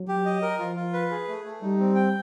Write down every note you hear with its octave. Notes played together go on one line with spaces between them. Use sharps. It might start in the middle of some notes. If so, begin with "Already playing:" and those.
Already playing: F#3
G4
D#5
A#4
F3 F4
F4
B4
G#4
A3
A3
G3 D#4
C4
G5